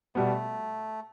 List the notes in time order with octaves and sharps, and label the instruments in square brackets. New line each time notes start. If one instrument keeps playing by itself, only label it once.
[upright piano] B2 G3 B3 [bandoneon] A3